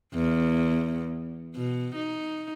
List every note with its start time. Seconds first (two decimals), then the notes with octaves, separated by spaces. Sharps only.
0.15 E2
1.56 B2
1.96 D#4